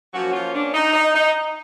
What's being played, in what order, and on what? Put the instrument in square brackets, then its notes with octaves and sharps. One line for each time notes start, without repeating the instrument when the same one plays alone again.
[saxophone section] F3 F#3 A#3 C#4 F#4
F3 F4
D4
D#4
D#4
D#4